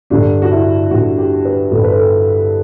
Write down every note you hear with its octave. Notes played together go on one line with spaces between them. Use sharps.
G2 D3 D4
F#4
E4
G2 D3 F#4
G4
B4
G2 D3 A4
B4
A4